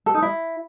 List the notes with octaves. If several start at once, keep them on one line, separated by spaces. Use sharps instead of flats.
A4
D#4
E4